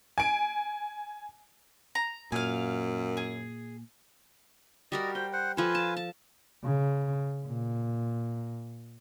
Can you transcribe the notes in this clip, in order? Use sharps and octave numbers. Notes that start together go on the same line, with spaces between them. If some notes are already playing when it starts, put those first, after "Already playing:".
G#5 D7
A#5
F#2 A#2 F5 G#5
G#4
G3 F#4 A#4 D5 D#5
C5 G5
C5 F#5
F3 F4 A4 B4 G#5
A5
A5
C#3
A#2